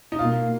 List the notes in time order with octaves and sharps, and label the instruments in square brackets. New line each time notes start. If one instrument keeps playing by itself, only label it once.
[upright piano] D#4
[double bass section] B2 A#3 [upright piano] F4